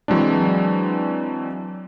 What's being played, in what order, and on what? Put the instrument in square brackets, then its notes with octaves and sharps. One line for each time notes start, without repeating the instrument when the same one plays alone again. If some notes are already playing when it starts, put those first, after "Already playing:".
[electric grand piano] E3 F#3 G#3 C4 D4